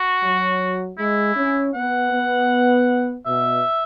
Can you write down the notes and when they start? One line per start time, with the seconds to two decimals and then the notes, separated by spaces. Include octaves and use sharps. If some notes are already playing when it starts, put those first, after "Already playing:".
Already playing: F#4
0.22 F#3
0.98 G#3 E4
1.36 C#4
1.74 B3 F#5
2.12 B3
3.26 B2 E5